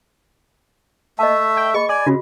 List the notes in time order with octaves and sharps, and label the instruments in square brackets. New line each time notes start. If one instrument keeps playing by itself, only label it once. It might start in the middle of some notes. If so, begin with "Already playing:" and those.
[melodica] A3 E5 [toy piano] D#5 A5
[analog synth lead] G5
[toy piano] G#4 D#5 B5 [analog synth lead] C#6
[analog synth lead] D5 [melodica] G#5
[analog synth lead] C#3 [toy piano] F4 F#4